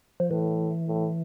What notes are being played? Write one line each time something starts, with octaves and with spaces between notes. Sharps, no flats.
F3
A2 E3
A2